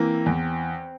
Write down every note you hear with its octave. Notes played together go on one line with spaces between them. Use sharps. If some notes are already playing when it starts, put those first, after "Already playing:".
Already playing: E3 A#3 C4
E2